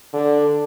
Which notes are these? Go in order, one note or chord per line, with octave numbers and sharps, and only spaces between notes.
D3